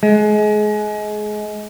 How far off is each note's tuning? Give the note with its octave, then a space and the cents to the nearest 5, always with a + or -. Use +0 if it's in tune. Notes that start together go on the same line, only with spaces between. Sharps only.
G#3 +25